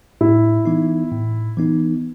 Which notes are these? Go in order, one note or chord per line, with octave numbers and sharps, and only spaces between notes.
A2 E4
E3 B3 D#4
A2
E3 B3 D#4